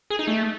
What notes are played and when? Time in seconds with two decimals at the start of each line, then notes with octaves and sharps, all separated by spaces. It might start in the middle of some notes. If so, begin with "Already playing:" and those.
0.10 G#4
0.19 D#4
0.27 A3